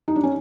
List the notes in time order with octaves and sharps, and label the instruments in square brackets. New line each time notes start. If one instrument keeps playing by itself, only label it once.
[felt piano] D#4
D4
C#4